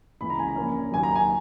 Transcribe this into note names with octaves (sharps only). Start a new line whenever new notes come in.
C#2 C#3 E3 B5
A#5
G#5
A#5
A#1 A#2 A#3 C#4
D#2 D#3 F#3 G#5
A#5
G#5